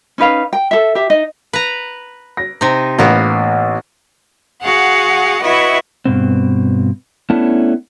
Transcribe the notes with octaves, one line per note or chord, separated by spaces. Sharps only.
C#4 D#4 B4 F5
G5
A4 E5
G4 E5
D#4 D#5
B4 A#5
A#6
C3 D#4
A1 A#3 B3
F#4 G#4 F5 F#5
E4 F#4 B4 C#5 D#5 E5
G2 B2 C4
A3 B3 C#4 D4 E4 A5